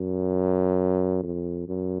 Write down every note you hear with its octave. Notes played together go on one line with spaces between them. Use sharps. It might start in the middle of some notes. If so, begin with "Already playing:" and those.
Already playing: F#2
F2
F#2